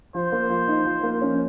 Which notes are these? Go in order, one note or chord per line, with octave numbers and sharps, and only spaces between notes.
F3 C5
A#3
F3
D#4
F3
A#3
C#4